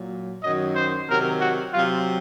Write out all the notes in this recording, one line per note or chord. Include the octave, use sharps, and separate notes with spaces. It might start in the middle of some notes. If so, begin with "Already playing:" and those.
Already playing: A#2 F#3
F#2 D#3 F#3 D#5
C5
C3 D#3 F#3 A#4
F#4
C3 F#3 F4